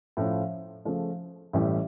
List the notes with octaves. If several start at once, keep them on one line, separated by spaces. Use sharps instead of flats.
A2 F3 C#4 F4
C#3 F3 A3
A1 A2 G3 C#4 G4